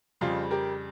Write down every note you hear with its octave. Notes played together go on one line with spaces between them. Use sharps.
F2 C#3 G3 F4 G#4
G4 A#4